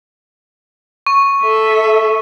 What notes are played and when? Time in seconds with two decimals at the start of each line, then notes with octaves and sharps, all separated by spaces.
1.07 C#6
1.43 A4 E5